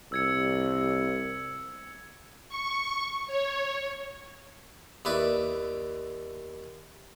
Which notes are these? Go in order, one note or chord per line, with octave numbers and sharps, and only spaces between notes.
C2 E6 G#6 C#7
C#6
C#5
D#2 E4 B4 D5